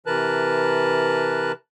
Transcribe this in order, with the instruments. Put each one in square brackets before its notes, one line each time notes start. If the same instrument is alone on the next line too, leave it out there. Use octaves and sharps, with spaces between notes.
[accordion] C3 E3 A#4 B4 A5 F#6